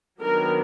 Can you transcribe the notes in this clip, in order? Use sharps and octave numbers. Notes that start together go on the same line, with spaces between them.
D#3 F#3 B3 D4 A#4